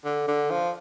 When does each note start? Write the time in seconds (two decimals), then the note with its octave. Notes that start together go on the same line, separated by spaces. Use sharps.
0.05 D3
0.28 D3
0.51 F3